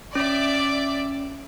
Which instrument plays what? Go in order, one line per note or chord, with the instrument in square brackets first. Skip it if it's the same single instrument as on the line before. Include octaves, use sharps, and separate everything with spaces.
[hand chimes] C#4 [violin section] D5 E5 D6